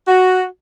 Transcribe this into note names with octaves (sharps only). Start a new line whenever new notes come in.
F#4